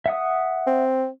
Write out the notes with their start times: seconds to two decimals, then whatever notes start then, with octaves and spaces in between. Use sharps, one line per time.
0.06 E5 F#5 D#6
0.67 C4